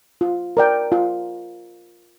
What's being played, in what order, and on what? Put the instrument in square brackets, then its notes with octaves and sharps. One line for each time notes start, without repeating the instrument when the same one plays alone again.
[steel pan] F4
A#4 D5 G5
F4